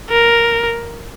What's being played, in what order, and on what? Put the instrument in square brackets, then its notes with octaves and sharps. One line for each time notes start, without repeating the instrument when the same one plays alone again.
[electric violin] A#4